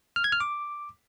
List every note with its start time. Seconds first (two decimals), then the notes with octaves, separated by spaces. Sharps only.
0.16 F6
0.24 G#6
0.32 F6
0.40 D6